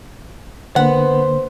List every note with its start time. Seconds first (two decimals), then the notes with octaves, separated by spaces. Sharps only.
0.76 D3 A#3 B3 C5 F#5